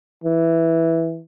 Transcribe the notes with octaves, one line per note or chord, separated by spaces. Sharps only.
E3